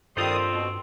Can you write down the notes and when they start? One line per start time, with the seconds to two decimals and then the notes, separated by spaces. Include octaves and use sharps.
0.17 G2 D#3 G3 C4 F4 A4 C5 D#6
0.49 B2